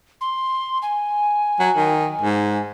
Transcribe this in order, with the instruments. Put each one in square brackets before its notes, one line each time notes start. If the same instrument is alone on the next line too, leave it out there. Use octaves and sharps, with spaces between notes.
[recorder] C6
G#5
[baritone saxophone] F#3
D#3
G#2